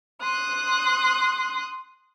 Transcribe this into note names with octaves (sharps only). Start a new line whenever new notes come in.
C6 D#6 F#6